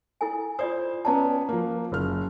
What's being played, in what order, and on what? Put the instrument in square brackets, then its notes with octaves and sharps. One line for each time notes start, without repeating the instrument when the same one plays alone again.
[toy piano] E4 A4 G#5
[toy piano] F4 D5 D#6 [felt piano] C5
[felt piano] B3 C#4 D5 [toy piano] A5 A#5
[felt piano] F3 A#3
F#1 F6